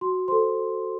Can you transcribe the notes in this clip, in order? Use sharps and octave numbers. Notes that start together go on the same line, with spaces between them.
F#4 C6
A4 C5 C6